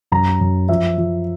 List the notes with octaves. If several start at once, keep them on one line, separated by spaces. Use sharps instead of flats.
F#2 A#5
F#2
F3 E5
F3